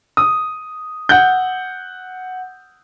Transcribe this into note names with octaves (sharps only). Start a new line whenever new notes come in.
D#6
F#5 G6